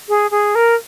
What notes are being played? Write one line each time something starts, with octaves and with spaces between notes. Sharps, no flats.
G#4
G#4
A#4